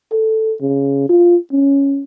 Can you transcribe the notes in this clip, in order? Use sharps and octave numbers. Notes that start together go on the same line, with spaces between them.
A4
C#3
F4
C#4